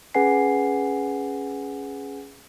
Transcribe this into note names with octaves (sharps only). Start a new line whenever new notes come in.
C#4 G#4 B4 F#5 G#5 C7